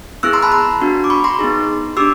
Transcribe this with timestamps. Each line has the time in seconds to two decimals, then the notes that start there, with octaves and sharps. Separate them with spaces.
0.23 B3 E4 G#4 E6 F#6
0.33 A#5 C6
0.43 A5 B5
0.52 A#5 C6
0.81 B3 D4 F#4
1.04 D6
1.10 B5 C#6
1.24 A#5 C6
1.39 B3 D#4 G#4
1.97 D4 G4 D6 E6